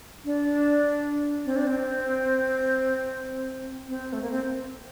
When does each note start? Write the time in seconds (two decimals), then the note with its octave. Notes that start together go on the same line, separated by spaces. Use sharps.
0.25 D4
1.46 C4
1.56 D4
1.67 C4
3.88 C4
4.13 A3
4.22 A#3
4.31 C4